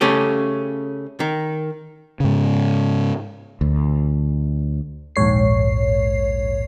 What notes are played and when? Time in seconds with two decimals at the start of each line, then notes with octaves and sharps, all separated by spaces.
0.01 C#3 A3 C#4 G4
1.20 D#3
2.20 G#2 C#3
3.61 D2
5.16 A#1 D#2 G#2 C#5 C7